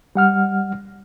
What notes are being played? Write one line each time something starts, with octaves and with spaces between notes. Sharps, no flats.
G3 F#5 F6